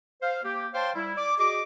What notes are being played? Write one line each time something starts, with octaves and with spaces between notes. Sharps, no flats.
C5 F5
A#3 G4
C5 C#5 F5 G5 A5 C6
G3 E4
D5 D6
F#4 G#4 D#5 D6